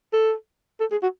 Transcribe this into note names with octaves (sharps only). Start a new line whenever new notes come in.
A4
A4
G#4
F#4